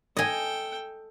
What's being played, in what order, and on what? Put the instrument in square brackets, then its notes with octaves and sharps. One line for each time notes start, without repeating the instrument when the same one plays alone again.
[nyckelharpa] A4 G5 [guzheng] D#5 G#5